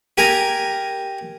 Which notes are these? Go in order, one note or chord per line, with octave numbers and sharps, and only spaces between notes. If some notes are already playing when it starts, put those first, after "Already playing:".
G4 A#4 G#5 A#5